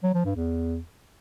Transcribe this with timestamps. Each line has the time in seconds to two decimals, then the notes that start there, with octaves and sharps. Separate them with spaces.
0.04 F#3
0.14 F3
0.25 G2
0.36 E2